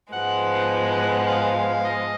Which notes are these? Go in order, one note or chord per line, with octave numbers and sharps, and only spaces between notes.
G#2 F3 G#3 B3 F#5
F5
D#5